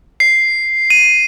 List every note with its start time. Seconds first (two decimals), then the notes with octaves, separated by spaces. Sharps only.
0.20 C7
0.90 D#7